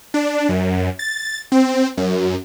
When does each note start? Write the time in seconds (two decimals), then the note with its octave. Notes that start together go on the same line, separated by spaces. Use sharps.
0.14 D4
0.49 F#2
0.99 A6
1.52 C4
1.97 F#2